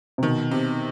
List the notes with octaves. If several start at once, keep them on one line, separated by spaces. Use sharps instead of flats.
C3
B2 D#3
C3